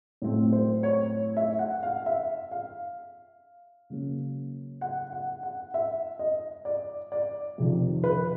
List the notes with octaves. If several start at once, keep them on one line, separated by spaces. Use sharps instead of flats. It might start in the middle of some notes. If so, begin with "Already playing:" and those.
A2 F#3 A3 C4
C5
C#5
E5
F#5
F5
E5
F5
C#3 F#3 A#3 C#4
F#5
F#5
F#5
E5
D#5
D5
D5
F2 C3 D#3
B4